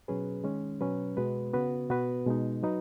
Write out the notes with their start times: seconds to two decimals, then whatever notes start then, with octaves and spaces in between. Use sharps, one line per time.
0.08 B2 F#3 C#4 G#4 B4
0.44 D#3 G#3 C#4
0.81 B2 F#3 C#4 B4
1.17 B2 G#3 B3 F#4 B4
1.53 C#3 B3 F#4 B4
1.90 B2 B3 F#4 B4
2.27 B2 G#3 D#4
2.63 F#3 D#4 F#4 B4